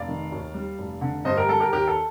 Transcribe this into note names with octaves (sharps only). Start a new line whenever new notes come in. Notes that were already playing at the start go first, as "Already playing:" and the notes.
Already playing: F1 D5 F5
D#3
D#2
G3
F1
D3
G2 C5 D#5
G4 A#4
G3 A4
G4 A#4
D#2 G4 A#4
A4